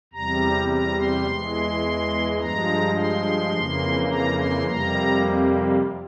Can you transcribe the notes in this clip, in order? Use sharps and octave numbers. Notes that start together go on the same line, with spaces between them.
E2 C3 G3 A#5
A#5
C6
E2 E3 G#3
G2 F3 G#3 A#5
C6
F2 C#3 E3 A#3
A#5
C6
F2 C3 G3 A#3 A#5